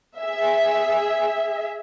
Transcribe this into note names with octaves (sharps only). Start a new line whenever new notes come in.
G#4 E5